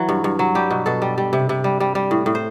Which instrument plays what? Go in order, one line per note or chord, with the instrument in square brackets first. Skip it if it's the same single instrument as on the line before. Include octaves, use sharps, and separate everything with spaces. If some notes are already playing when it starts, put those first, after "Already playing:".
Already playing: [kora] E3 F#3
G2
G2
F#3
G3 G4
B2
B2 A4
G3
G3
C3
C3
G3
G3
G3
A2
A2
C5